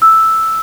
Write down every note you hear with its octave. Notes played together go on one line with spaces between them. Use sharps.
E6